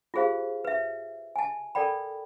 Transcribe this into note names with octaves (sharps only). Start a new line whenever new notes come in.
F4 G4 G#4 C5 F5
B4 E5
G#5 A5
A4 A#4 D5 G5 B5